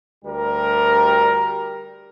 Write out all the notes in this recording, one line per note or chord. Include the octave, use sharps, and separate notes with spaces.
D2 G3 G4 A#4